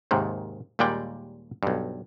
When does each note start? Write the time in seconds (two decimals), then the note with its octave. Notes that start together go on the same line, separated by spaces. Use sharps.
0.11 D#2 G#2 C3 D#3
0.79 D#2 A#2 G3 G#3 D5 G5
1.63 B1 G2